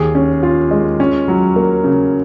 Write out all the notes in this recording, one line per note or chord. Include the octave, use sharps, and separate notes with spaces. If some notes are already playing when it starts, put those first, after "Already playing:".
Already playing: D#2 G#4
C#4
F4
G#3
C#4
F#3
A#3
C#3